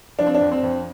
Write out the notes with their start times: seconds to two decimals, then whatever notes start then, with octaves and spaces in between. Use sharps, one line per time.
0.19 F3 D4
0.27 C4
0.35 D4
0.41 F2
0.52 C4
0.63 F2